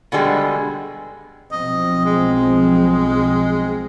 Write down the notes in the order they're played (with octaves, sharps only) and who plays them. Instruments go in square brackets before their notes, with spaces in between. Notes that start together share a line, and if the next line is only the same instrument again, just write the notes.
[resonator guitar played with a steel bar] B2 D3 G3 G#3
[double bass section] B1 F3 C4 [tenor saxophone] D#5
[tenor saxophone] G#3